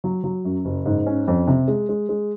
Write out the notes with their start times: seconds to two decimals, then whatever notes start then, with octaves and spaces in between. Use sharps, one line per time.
0.04 F#3
0.24 F#3
0.45 F#2
0.65 F#1
0.86 G#2
1.07 C#4
1.28 F2
1.47 C3
1.68 G#3
1.89 G#3
2.09 G#3